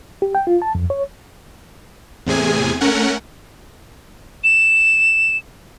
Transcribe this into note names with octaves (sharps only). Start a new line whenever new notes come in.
G4
G5
F4
A5
F2
C#5
E2 A2 C3 G#4 G#5
A3 C#4 A#4 F#5
E7